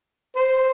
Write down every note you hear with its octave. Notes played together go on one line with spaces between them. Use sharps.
C5